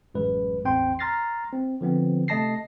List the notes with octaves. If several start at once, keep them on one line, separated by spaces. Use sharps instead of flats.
A1 F#2 G#3 B4
A1 E2 C4 G5 C6
A#5 C6 F6 A6 A#6 C7
C4
D3 F3 B3 C4
C3 A3 D#5 A5 A#6 C7